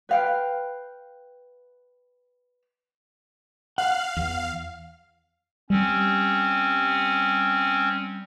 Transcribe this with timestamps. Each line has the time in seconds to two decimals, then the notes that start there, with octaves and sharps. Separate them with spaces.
0.09 B4 F5 G5
3.78 F5 F#5
4.17 E2
5.70 G3 C4 C#4